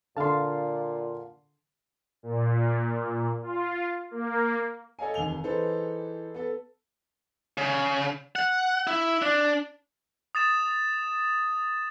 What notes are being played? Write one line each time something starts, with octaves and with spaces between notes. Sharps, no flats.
A#2 D3 F5 A5 C6
A#2
F4
A#3
A4 C#5 D#5 F5 G#5
F1 D#2 G#5 F7 G7
E3 D#4 G#4 A4 B4 C5
B3 A4
C#3
F#5
E4
D4
D#6 A6 E7